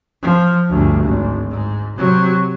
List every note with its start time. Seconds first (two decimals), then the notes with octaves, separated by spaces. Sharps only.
0.22 F3
0.70 G1 D2
1.03 G#1
1.51 G#2
1.96 C3 F#3